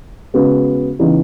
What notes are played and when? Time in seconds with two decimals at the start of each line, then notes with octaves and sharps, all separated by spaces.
0.34 C#3 G#3 B3 F#4 B4
0.99 C#3 E3 B3 D#4